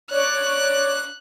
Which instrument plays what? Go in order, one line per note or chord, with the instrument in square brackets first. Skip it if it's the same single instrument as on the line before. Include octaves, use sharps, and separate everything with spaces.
[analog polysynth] C#5 D5 D6 [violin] F#6